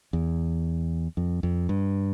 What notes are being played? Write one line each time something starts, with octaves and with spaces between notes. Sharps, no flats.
E2
F2
F2
G2